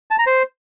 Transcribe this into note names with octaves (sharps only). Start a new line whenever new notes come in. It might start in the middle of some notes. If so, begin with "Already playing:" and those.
A5
A#5
C5